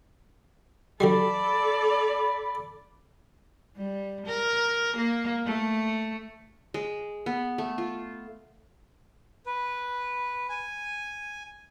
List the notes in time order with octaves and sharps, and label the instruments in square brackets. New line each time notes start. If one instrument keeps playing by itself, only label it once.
[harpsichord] D3 F#3 G3 [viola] A4 D5 [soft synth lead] B5
[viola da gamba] G3
A#4
A#3
A3
[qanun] G#3
B3
A3
F4
[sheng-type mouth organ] B4
G#5